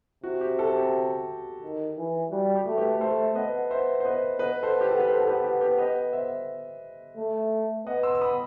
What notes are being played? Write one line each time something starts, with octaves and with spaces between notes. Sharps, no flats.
C3 F#4
G4
F#4 A4
G4
D#3
E3
G3 F#4
G4
A3
G4 B4
A3 A4 C5
B3 B4 D#5
C5 E5
C5
B4 D#5
B3 B4 D#5
A4 C5
G4
A4
B4
A4 C5
A4
G4 B4
G4
G4 B4
B4 D#5
C5 E5
A3
B3 D#5 F#5
C6 E6
E6
B5 D#6